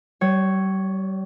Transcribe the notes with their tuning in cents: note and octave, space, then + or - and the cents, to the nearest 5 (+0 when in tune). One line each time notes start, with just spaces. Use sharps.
G3 -35 C#5 +0